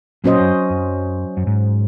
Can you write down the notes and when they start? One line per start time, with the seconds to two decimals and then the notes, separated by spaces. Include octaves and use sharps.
0.24 A#2 F#3 C#4 F#4 C5 D#5
0.40 F#2
0.70 F#2
1.37 F#2
1.47 G#2